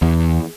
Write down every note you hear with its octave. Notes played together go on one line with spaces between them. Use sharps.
E2